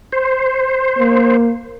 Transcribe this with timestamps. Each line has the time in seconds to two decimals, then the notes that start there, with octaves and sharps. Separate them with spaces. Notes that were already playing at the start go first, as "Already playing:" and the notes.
0.12 C5
0.99 A#3